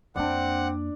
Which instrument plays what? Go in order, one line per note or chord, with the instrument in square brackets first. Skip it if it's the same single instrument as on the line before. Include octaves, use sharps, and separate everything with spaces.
[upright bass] F2 A#3 [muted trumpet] C4 [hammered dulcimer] D4 D5 [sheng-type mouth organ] F#5